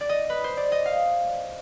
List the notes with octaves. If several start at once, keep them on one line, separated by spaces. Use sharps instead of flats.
D5
D#5
B4
C5
D5
D#5
F5